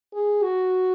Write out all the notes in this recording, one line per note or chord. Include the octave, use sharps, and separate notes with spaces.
G#4
F#4